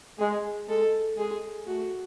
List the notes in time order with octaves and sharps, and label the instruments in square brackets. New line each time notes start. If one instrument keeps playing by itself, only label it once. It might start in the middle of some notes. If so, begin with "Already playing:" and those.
[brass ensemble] G#3 [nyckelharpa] G#4
[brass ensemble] G#3 [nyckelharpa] A4
[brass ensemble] G#3 [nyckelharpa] G#4
[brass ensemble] A3 [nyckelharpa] F#4